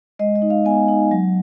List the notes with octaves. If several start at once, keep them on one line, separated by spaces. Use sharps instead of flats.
G#3 D#5
D#5
D#4
F5
B3 G#5
D#4
F#3